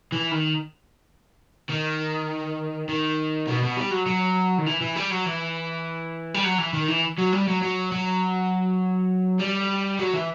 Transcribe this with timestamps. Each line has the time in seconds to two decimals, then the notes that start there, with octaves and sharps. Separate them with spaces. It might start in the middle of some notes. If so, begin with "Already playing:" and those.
0.12 E3
0.32 D#3
1.70 D#3
2.89 D#3
3.48 B2
3.63 B2
3.77 G3
3.92 F#3
4.06 F#3
4.58 D#3
4.66 E3
4.81 E3
4.96 G3
5.10 F#3
5.26 E3
6.34 G3
6.44 F#3
6.58 E3
6.73 D#3
6.88 E3
7.18 F#3
7.32 G3
7.48 F#3
7.62 F#3
7.92 F#3
9.40 G3
9.99 F#3
10.14 E3